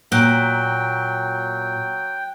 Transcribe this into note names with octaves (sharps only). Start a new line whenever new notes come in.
A#2 F#3 G5 F#6 D7 G7